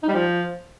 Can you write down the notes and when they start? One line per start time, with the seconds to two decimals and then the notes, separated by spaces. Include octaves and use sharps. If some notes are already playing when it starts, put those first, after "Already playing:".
0.03 D#4
0.08 G3
0.13 F3